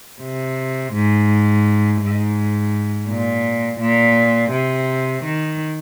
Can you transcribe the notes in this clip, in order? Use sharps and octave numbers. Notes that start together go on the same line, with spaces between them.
C3
G#2
G#2
A#2
A#2
C3
D#3